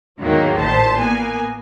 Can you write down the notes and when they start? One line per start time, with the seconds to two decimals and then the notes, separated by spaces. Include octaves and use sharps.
0.20 E2 G#2 D#3 F#3 A#3
0.57 A1 A#2 C5 A5
0.98 A#3 B3 G#5